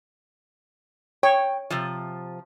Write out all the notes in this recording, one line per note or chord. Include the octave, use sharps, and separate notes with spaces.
C#5 G5
C3 F3